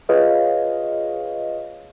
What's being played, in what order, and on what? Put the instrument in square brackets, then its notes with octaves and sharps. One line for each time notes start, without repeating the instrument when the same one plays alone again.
[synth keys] F4 G#4 B4 C#5 D#5 F5